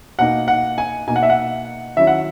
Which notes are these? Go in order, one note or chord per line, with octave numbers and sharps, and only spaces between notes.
B2 A#3 D#4 F#5
F#5
G#5
B2 A#3 D#4 G#5
F#5
E5
F#5
D#3 F#3 C#4 E4 E5
F#5